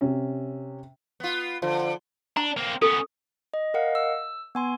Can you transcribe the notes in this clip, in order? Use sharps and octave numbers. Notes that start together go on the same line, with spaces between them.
C3 C#4
B3 F4
D3 F3
D4 A#5
A#3 C4
B3 C#4 A4
D#5
A#4 D#5 F5 F#5
E6
B3 G#5 C6